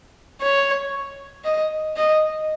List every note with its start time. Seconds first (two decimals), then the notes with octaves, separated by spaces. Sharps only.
0.41 C#5
1.45 D#5
1.96 D#5